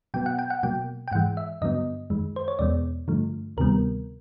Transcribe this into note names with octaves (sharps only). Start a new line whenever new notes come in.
B2 F#3 B3 G5
F#5
G5
F#5
B2 F#3 A#3 G5
G5
G#2 E3 G#3 F#5
E5
G2 D3 F#3 B3 D#5
F#2 D#3 G#3
C5
C#5
E2 B2 G#3 B3 D5
G2 D3 F3 A3
D2 C3 D#3 G3 B3 A#4